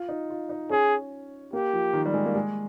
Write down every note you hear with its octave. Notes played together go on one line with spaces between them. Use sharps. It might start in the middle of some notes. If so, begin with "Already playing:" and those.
Already playing: F4
D#4
F4
D#4
C#4 G#4
A#3 G4
F3
D#3
G3
G#3
A#3
G#3